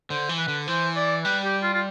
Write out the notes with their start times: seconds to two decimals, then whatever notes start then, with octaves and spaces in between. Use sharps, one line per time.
0.10 D3 C5
0.29 E3
0.38 B4
0.48 D3
0.67 E3 C5
0.96 D5
1.24 G3 B4
1.44 G4
1.63 F4
1.74 F4